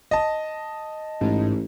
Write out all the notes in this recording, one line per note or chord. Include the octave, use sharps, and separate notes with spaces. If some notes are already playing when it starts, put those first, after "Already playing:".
D#5 A5
A1 G#2